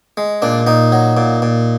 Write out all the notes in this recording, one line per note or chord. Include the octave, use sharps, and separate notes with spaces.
G#3
A#2 D4
A#2 D#4
F#3
A#2
A#2